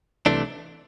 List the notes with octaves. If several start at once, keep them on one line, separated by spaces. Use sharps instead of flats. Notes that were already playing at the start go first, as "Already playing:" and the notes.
C2 C3 E3 A3 D4